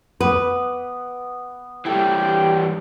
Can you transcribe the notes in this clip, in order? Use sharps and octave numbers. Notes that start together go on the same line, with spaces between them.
B3 B4 D6
E3 G3 G4 A4 G5